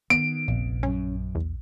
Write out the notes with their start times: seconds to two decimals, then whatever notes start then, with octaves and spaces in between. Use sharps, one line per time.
0.10 D#3 B3 D#4 D7
0.48 F1 A#1
0.83 F#2 C#4
1.35 E2